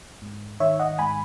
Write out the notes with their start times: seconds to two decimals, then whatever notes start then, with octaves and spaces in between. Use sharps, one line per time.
0.22 G#2
0.60 D#3 C#5 E5
0.79 D#5 F#5
0.99 G#2 G#5 B5